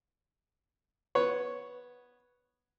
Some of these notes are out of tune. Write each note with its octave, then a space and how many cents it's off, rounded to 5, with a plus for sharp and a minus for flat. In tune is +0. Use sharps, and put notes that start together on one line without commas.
B3 -5 C#5 +0